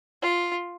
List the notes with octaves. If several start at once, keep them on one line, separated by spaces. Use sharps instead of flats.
F4